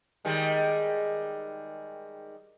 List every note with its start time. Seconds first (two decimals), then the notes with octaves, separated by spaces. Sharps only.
0.25 D#3 G3 G#3